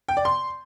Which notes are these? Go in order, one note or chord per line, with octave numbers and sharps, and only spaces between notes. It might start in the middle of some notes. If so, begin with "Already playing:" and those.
G5
D5
C6